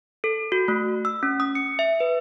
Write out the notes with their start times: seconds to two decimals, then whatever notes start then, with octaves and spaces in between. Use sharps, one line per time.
0.24 A4
0.52 F#4
0.68 A3
1.05 E6
1.23 C#4
1.40 D#6
1.55 C#7
1.79 E5
2.00 B4